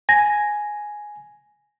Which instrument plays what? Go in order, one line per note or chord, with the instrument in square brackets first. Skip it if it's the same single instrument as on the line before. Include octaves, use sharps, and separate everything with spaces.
[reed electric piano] G#5 [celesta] A#6